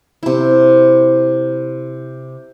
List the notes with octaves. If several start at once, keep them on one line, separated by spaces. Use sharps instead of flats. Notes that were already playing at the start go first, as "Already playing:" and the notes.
C3 E4